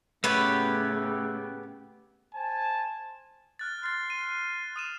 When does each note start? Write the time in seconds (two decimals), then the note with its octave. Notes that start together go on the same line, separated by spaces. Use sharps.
0.24 A2 C#3 A3 B3 G4 B4 C#5
2.33 C5 G#5 A5
3.59 F6 F#6 A6
3.83 C6 F6 A6
4.10 D#7
4.76 D#6 D#7 E7